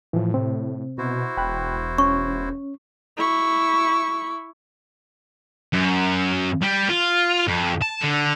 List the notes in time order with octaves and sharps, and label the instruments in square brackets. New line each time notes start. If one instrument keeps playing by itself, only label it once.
[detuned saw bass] A2 [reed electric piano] E3 F3
[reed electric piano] C3 C4
[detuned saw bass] B2 [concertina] E4 F#4 C5
[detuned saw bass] E1 [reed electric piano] G5 B5 F#6
[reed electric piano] C#4 [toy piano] C#6
[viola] E4 C#6
[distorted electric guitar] F#2
G3
F4
F2
A5
D3